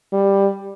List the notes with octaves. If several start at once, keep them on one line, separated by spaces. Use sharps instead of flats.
G3